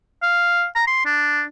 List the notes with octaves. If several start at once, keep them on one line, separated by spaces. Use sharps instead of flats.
F5
A#5
C6
D4